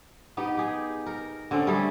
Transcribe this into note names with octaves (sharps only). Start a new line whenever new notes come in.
B3 D#4 G4
G4 G#4
A#4
D3 C4 C#4
G3 A3 C#4 G#4